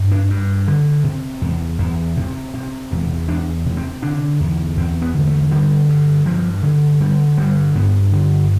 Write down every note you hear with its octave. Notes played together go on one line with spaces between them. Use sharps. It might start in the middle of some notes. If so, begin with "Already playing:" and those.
Already playing: G2
D4
G2
D3
C3
E2
E2
C3
C3
E2
E2 D4
C3
C4
D3 D4
E2
E2 C4
B3
D3
A3
D3 G3
G2
G2 F3
D3
D3 G3
G2 G3
G2 B3
D3